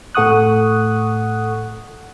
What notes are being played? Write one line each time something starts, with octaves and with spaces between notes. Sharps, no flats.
A2 A4 F#5 C#6 D#6 F#6